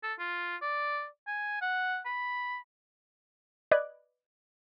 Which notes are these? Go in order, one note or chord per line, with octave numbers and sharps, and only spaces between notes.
A4
F4
D5
G#5
F#5
B5
B4 D5 D#5 D6 F#6 G#6